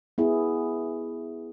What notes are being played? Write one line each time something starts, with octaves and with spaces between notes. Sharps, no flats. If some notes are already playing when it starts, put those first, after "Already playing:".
B3 E4 G#4